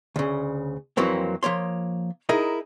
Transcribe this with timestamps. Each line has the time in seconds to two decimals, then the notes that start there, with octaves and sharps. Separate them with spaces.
0.16 D2 C#3
0.97 F2 E3 F#3 A#3 C4
1.43 F3 A#3 C#5 C6
2.29 D#4 E4 G#4 A#4 D#5